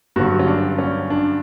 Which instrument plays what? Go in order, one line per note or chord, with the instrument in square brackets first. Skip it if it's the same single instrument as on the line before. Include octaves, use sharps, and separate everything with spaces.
[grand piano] G2 D3 F#3 F#4
C#4
D4
C#4
D4